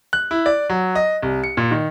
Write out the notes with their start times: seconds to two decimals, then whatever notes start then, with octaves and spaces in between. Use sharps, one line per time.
0.13 F#6
0.31 E4
0.46 D5
0.70 F#3
0.95 D#5
1.22 C2
1.44 C#7
1.57 A#2
1.71 D#3